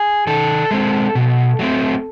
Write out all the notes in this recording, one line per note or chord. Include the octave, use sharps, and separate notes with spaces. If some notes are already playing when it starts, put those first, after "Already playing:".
Already playing: G#4
D#3 A4
G#3 C4
B2
F#3 A3 C4